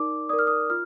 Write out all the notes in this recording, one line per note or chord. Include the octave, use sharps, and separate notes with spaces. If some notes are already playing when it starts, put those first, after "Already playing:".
Already playing: D#4 A#4 D5 D6
A#4 D5 D#6
F6
D#6
F4 F6